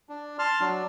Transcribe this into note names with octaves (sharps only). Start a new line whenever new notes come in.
D4
A5 C6 F6
F#3 D4